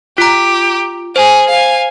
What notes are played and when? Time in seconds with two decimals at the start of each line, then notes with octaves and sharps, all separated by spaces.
0.18 F4 G4 A#5
1.16 G#4 C5
1.49 F5 G#5